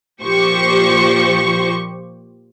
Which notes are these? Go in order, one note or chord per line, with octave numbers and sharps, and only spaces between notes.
A#2 F3 G4 C5 C#6